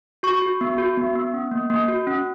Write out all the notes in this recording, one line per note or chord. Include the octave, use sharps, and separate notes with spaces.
F#4 C#6
F#4
B3
F#4
B3
B3
C#4
A#3
A#3
F#4
C#4